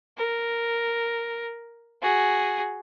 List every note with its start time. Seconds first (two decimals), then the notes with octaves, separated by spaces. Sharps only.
0.18 A#4
2.02 F#4 G#4